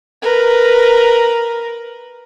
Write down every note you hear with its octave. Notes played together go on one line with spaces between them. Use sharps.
A#4 B4